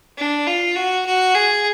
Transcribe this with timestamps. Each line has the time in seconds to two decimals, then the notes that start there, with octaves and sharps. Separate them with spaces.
0.18 D4
0.47 F4
0.75 F#4
1.06 F#4
1.35 G#4